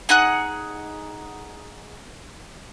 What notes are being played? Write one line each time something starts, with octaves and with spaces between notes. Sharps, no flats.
D#4 G#4 F#5 F#6